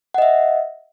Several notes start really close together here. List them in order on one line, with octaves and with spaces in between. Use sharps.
F#5 D#5 E5